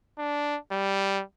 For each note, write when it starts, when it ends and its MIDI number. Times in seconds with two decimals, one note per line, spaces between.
0.18 0.57 62
0.72 1.22 55